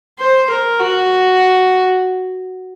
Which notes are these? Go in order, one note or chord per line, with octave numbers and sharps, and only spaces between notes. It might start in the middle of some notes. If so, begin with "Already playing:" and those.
C5
A#4
F#4